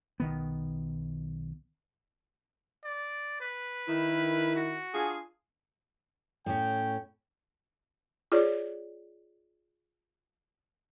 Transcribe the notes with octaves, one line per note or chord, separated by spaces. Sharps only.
B1 D#3 B3
D5
B4
D#3 E4
F#4
D4 F4 G#4
A2 C#4 G5
F4 G#4 C#5 D5